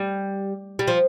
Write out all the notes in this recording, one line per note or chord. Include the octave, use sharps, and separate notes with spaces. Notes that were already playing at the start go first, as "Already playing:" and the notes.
Already playing: G3
G3
F3